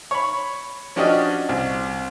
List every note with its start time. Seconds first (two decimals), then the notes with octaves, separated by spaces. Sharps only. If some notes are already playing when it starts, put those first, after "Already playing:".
0.11 C#5 B5
0.96 F3 C#4 D4 F#4 G4 D#5
1.49 C2